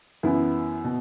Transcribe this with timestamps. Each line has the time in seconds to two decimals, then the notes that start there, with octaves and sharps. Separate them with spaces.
0.23 F#2 E3 B3 E4
0.84 B2